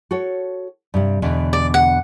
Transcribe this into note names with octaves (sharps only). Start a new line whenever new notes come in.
F#4 A4 C#5
G2 C3 G3
E2 B2 D3
D5
F#5